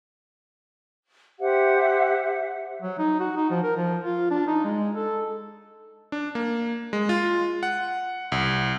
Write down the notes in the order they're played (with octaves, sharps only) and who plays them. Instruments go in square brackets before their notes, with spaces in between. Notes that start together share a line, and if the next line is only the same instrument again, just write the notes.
[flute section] G4 C5 E5 F#5
[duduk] F#3
D#4
F#4
D#4
F3
A#4
F3
F4
D4
D#4
G#3
A4
[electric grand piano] D4
A#3
G#3
F4
F#5
C2